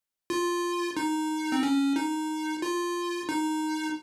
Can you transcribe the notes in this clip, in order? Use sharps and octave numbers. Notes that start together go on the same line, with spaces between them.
F4
D#4
C4
C#4
D#4
F4
D#4